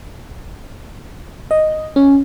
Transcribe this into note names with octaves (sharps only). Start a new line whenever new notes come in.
D#5
C#4